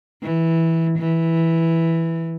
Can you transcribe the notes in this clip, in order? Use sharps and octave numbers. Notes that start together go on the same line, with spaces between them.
E3
E3